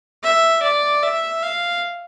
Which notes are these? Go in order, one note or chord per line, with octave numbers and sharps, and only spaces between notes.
E5
D5
E5
F5